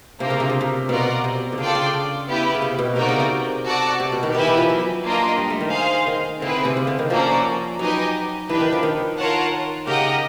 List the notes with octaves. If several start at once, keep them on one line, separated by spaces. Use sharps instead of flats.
C3 A#3 D4 F4 A#4
C#3
C3
C#3
C3
B2 F4 A#4 D5 F#5
C3
D3
C#3 D4 F4 A4 D5 G5
C#3
B3 E4 G4 B4
C#3
C3
B2
C3 D#4 F#4 A#4 D5 G5
C#3
C3
F#4 A4 D5 F#5 A5
C3
B2
D#3
D#3 E4 G4 B4 E5 G#5
E3
F3
F#3
A#3 D4 F4 A#4 D#5
G3
A3
D#3
G#4 C5 F5
D#3
D3 C4 E4 G#4 B4
C3
C#3
D3
D#3
F3 A#3 C#4 F#4 A4 D5
F#3 D#4 G4 B4 D#5 G#5
E3 D4 G4 B4
D#3
F3
D#3
F4 A#4 C#5 F#5 A5
C#3 G4 A#4 D#5 F#5